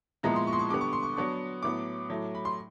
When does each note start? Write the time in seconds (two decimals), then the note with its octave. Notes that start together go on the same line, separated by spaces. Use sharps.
0.23 A#2 F3 G#3 B3 E4 A#5
0.36 C6
0.47 C#6
0.53 C6
0.59 C#6
0.70 D3 G3 B3 D6
0.81 C#6
0.93 C6
1.03 C#6
1.16 F#3 B3 D4 C#6
1.63 A2 F#3 B3 D6
2.10 A2 F#3 A3
2.35 B5
2.45 C6